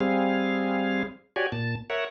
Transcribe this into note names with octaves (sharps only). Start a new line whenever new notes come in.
G3 C4 G#4 F5
F#4 G4 C#5 D5 G#5
A#2 A5
A#4 C#5 E5 F#5